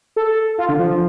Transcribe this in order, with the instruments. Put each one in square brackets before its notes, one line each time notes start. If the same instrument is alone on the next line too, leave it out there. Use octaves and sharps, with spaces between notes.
[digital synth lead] A4
F4
D3
F3